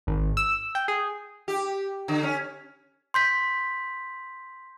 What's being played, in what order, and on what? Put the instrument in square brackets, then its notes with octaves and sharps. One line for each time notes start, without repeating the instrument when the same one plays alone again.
[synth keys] G#1
E6
G5
G#4
[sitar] G4
D3
C#4
[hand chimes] C6 G6 B6